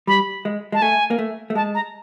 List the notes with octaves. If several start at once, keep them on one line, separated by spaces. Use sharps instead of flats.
G3 B5
G#3
G#3 A5
A3 G#5
A#3
A3
A3
G#3 A5
A#5